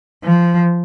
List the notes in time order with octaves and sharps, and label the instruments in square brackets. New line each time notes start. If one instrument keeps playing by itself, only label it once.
[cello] F3